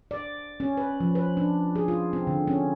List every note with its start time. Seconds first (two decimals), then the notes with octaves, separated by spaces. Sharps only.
0.11 D5
0.60 C#4
0.77 B4
1.00 F3
1.15 B4
1.37 D4
1.76 G#4
1.88 F4
2.13 C4
2.27 D3
2.48 C#4